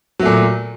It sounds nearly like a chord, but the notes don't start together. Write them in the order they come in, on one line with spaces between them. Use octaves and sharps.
F#3 A3 A#2